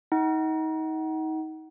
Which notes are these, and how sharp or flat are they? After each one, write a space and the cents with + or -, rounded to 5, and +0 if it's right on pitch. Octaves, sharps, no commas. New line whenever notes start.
D#4 +30 F#5 +30